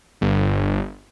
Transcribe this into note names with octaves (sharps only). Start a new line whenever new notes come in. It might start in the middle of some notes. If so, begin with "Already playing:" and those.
G1